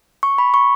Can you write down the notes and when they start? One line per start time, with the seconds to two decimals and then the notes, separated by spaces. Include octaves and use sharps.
0.23 C#6
0.38 B5
0.54 C#6